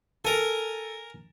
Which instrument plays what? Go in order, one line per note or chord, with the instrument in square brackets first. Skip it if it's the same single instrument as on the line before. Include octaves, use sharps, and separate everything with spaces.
[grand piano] A4 [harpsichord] A#4 G#5